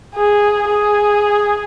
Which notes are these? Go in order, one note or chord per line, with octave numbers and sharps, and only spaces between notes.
G#4
G#4